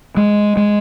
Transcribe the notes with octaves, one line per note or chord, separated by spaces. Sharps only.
G#3
G#3